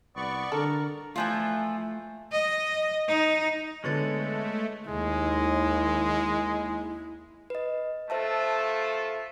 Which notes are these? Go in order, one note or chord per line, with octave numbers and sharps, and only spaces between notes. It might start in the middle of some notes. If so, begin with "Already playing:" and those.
C2 B3 D5 C#6
D3 A4 A#4
E3 F3 A3 F4
D#5
D#4
D3 G#3 A3 B3 C#5 A6 C#7 F#7
D#2 G#3 E4
B4 D#5
A3 F4 A4 C5 E5 A5